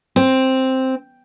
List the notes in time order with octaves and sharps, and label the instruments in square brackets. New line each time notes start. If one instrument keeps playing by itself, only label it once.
[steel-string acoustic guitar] C4